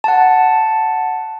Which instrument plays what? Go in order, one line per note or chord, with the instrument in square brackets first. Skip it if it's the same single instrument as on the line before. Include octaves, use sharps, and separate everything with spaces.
[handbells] F#5 A5